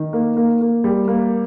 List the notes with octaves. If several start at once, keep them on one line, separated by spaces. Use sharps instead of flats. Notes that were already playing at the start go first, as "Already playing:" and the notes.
Already playing: D#3
A#3
A#3
A#3
G3
A#3